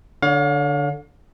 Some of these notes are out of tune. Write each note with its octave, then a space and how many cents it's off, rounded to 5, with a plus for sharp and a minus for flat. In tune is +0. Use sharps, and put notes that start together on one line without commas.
D3 +0 C#5 +30 F5 +35